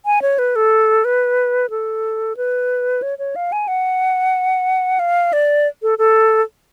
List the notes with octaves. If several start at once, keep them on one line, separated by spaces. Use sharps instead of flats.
G#5
C#5
B4
A4
B4
A4
B4
C#5
C#5
F5
G#5
F#5
F5
D5
A4
A4